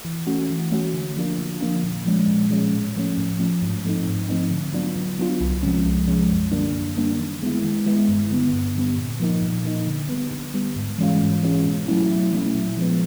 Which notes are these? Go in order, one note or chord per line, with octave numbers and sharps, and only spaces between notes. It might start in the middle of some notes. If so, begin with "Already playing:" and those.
E3
A3 C#4 F#4
E3
A3 C#4 F#4
D3
F3 A#3 D4 F4
D3
F3 A#3 D4 F4
A#2
F3 G#3 C#4
A#2
F3 G#3 C#4
A2
F3 A3 C#4
A2
F3 A3 C#4
G#2
F3 A3 C4 D#4
G#2
F3 A3 C4 D#4
D3
F#3 B3 D4 F4
D3
F#3 B3 D4 F4
C2
C3 F3 G#3 C#4
C2
C3 F3 G#3 C#4
F#2
D3 G3 A#3 D4
F#2
D3 G3 A#3 D4
D#3
G#3 B3 E4
D#3
G#3 B3 E4
G2
D3 G3 B3
G2
D3 G3 B3
A#2
F3 A#3 D#4
A#2
F3 A#3 D#4
D3
G3 B3
D3
G3 B3
G#2
E3 G#3 C#4 F4
G#2
E3 G#3 C#4 F4
B2
F#3 A3 C#4 E4
B2
F#3 A3 C#4 E4
A#2
F3 G#3 B3